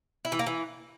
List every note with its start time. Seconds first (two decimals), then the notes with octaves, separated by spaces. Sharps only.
0.25 E4
0.32 E3
0.39 A#3
0.46 E3